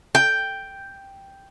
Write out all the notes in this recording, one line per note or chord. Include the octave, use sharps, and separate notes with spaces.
G5